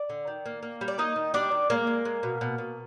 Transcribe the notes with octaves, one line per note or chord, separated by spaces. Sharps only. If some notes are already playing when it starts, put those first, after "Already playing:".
Already playing: D5
D3
D#3
A#3
A#3
G3
D5
A#3 D#4 D#5
D#3
G3 D4 D5
D#3
G#3 A#3 A#4
G#3
G#3
B2
B2
B2